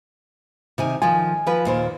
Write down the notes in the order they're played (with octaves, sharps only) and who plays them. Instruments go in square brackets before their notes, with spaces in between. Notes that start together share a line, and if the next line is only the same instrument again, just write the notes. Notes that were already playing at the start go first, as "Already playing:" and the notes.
[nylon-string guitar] C3 D#3 G#5
[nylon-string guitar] D#3 F3 F4 [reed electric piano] G#5
[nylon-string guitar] F3 B4
D#2 A#2 C5